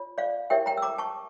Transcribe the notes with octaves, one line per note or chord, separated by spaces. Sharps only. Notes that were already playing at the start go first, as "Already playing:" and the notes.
Already playing: F4 C#5
D5 F5
E4 G4 A#4 C#5 E5 G5
G5 A#5
E6
A#5 D6
A5 C#6